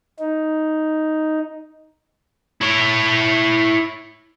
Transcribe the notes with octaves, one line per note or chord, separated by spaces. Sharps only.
D#4
E4 C#5